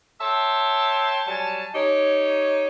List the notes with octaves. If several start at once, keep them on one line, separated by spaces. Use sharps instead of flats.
C#5 E5 G5 A5 C6
F#3 G3 G#5 A5
D#4 G4 C#5